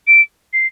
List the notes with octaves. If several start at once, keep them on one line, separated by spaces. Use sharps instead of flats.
D7
C7